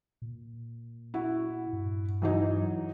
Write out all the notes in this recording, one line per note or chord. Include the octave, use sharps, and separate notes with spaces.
A#2
E4 F#4
G2
E3 F#3 D#4